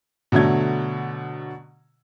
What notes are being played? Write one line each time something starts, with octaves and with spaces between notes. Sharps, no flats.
B2 D3 F#3 A3 G#6